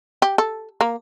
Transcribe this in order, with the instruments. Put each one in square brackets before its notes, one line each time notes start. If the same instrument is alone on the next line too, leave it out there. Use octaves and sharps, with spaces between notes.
[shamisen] G4
A4
A#3